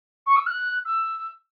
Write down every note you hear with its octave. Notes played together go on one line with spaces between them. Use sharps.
C#6
E6
F#6
E6